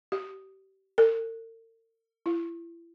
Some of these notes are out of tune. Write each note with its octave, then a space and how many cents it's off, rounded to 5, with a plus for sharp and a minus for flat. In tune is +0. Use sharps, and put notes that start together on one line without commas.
G4 -30
A#4 -45
E4 +35